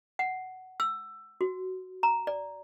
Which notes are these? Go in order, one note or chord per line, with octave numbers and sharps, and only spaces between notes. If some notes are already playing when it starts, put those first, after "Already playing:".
F#5
E6
F#4
A#5
D5